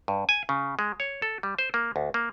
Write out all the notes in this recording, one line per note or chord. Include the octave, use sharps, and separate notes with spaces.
G2
G#5
C#3
G#3
C#5
A4
G3
C5
A#3
D2
A#3